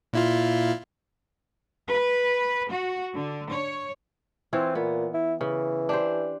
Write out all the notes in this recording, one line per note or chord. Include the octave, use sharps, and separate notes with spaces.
A#2 E4 F4
B4
F#4
D3
C#5
E3 C4 F4 C#5
A#2 B3
E4
C#3 E3
D4 G4 C5